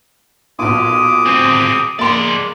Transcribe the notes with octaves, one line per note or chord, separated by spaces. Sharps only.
B1 A#2 D6 D#6
C4 G#4
G#3 A#3 D5 C6